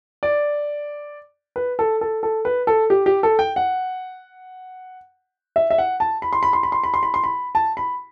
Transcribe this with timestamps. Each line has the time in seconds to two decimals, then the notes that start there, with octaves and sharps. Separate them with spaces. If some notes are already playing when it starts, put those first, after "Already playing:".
0.23 D5
1.56 B4
1.79 A4
2.01 A4
2.23 A4
2.45 B4
2.67 A4
2.90 G4
3.06 G4
3.23 A4
3.39 G5
3.56 F#5
5.56 E5
5.70 E5
5.78 F#5
6.00 A5
6.22 B5
6.33 C6
6.43 B5
6.53 C6
6.63 B5
6.72 C6
6.84 B5
6.94 C6
7.03 B5
7.14 C6
7.24 B5
7.55 A5
7.77 B5